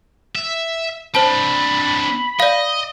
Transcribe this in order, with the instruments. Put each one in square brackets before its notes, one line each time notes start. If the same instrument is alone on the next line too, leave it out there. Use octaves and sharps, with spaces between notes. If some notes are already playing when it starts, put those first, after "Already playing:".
[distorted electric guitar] E5
[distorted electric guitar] C4 D4 [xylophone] C5 A5 [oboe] B5
[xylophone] D5 F5 [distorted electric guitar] D#5